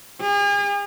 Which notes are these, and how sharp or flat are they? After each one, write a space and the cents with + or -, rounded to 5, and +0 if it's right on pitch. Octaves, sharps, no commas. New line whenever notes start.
G#4 -40